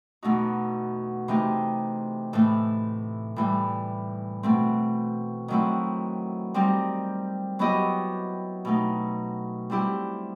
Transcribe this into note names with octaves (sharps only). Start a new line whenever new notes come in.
E2 B2 A3 D#4 F#4
C3 E3 A3 D#4 G4
A2 E3 A3
A2 E3 G3
B2 A3 C4
D#3 F#3 A3 C4 E4
G3 C4 D#4 G4
F#3 B3 E4 G4 D#5
B2 A3 D#4
G3 C4 E4 G4